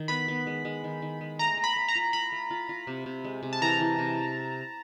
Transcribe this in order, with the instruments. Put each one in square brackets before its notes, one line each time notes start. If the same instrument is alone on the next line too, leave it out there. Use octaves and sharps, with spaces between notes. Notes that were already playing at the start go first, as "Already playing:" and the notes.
Already playing: [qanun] D#3
[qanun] B3 [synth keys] B5
[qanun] B3
G#3
G#3
D#3
D#3
G#3
[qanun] A3 [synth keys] A#5
[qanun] A3
[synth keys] B5
[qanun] A3
[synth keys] A#5
[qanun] F4
[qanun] F4 [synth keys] B5
[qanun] A3
F4
F4
C3
C3
G#3
C3
[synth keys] A5
[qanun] E3 [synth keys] A#5
[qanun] E3
C3